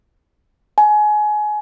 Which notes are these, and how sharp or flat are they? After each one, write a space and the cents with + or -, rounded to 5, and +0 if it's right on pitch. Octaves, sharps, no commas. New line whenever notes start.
G#5 +25